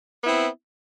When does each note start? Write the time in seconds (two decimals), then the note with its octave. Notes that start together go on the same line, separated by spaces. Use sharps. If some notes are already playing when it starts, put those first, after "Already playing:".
0.22 B3
0.25 E4
0.29 C4